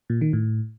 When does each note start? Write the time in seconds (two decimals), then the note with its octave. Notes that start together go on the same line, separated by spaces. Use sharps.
0.10 A#2
0.21 D#3
0.33 A2